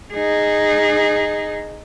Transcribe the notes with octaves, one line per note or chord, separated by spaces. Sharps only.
D#4 G#4